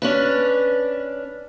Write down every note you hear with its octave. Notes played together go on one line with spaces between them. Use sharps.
C#4 D4 B4